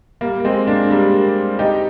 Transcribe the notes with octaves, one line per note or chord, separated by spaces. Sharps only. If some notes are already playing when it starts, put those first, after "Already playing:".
G3 A#3
G#3 C4
A#3 D4
G3 A#3
D#4 G4